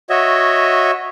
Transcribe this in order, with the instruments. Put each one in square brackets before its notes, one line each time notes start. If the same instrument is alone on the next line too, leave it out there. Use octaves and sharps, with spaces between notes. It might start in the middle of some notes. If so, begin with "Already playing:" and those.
[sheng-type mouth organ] F#4 C#5 D#5 E5